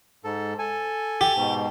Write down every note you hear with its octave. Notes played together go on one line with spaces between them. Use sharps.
G#2 A4
A4 G#5
G4
G#2 B2